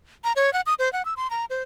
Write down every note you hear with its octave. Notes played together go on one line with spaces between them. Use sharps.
A#5
C#5
F#5
D#6
C5
F#5
E6
C6
A#5
C5